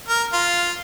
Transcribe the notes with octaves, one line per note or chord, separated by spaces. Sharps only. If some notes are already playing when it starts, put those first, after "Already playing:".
A#4
F4